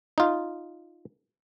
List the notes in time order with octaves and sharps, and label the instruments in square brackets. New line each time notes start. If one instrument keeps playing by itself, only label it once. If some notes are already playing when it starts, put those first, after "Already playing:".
[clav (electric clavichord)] D#4 F4